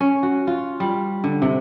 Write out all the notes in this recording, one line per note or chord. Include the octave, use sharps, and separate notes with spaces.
C#4
F#4
F4
G3
D3
C3